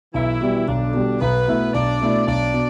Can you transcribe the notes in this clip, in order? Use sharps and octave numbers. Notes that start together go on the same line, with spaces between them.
B1 E3 E4
B2 G3
B1 D3 D4
B2 G3
B1 B3 B4
B2 A3 E4
B1 D4 D5
B2 A3 E4
B1 D4 D5
B2